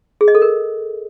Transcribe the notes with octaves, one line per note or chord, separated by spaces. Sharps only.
G#4
D#5
A4
A#4